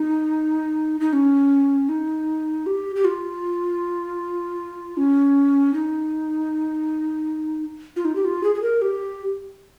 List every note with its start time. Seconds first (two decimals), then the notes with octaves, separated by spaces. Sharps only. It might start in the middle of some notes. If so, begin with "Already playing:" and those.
Already playing: D#4
1.00 D#4
1.13 C#4
1.89 D#4
2.66 G4
2.96 G4
3.05 F4
4.97 C#4
5.74 D#4
7.96 F4
8.05 D#4
8.16 G4
8.25 F4
8.43 G#4
8.55 G#4
8.62 A#4
8.82 G4